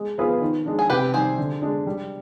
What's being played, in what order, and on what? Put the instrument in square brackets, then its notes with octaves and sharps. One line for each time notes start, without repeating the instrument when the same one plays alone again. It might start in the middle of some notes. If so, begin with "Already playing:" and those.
Already playing: [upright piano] G#3
B3 F4 G#4 B4
D#3
G#3 D4
[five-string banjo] G#4
[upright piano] C3 [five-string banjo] G4 B4
[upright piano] D#3 G3 [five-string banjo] G#4 C5
[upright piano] D3
G#3 D4
G3